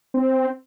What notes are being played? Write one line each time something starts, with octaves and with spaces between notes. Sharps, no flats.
C4